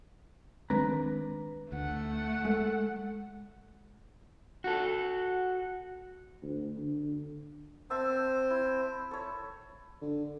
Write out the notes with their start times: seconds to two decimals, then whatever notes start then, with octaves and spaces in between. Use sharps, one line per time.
0.70 D#3 G#3 C4 D4 B4 A#5
1.72 D2 A3 F#5
2.45 G#3 A4
4.64 F#4 A4
6.42 D2
6.78 D3
7.90 C4 C5 E5 A5 E6
8.50 E4
9.11 A4 C#5
10.01 D3